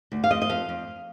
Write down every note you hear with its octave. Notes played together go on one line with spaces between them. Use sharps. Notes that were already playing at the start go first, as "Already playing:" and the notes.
D2
F5
F2 D#5
D#5
F2 F5
F2